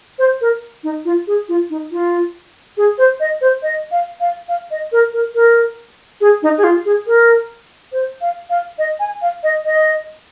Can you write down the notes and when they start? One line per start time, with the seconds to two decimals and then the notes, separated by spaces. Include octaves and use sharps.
0.19 C5
0.41 A#4
0.84 D#4
1.05 F4
1.27 G#4
1.49 F4
1.70 D#4
1.92 F4
2.77 G#4
2.98 C5
3.20 D#5
3.41 C5
3.63 D#5
3.91 F5
4.20 F5
4.49 F5
4.71 D#5
4.92 A#4
5.13 A#4
5.35 A#4
6.21 G#4
6.43 D#4
6.58 G#4
6.64 F4
6.85 G#4
7.07 A#4
7.92 C5
8.21 F5
8.50 F5
8.78 D#5
9.00 G#5
9.22 F5
9.43 D#5
9.65 D#5